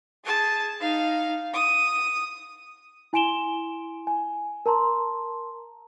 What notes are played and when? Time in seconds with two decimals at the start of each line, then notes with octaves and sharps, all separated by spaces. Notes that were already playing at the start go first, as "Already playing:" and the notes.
0.25 G#4 A5
0.80 D#4 F5
1.53 D#6
3.13 E4 G#5 C6 D7 E7 G7
4.07 G#5
4.66 A#4 A5 A#5 C6